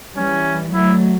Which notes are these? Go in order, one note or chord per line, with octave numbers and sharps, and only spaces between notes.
E3 G3 C#4
F#3 A3 E4